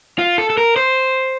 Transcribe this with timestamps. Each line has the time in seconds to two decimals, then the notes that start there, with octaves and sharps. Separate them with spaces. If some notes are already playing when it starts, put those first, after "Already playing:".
0.18 F4
0.38 A4
0.50 A4
0.58 A#4
0.76 C5